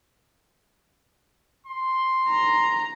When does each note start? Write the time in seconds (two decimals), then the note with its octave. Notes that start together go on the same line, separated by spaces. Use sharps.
1.67 C6
2.29 A#5